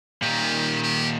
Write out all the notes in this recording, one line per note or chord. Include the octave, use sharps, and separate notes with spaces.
A#2 D#3 G4
G4